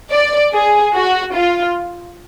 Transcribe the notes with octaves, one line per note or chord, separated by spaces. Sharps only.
D5
G#4
F#4
F4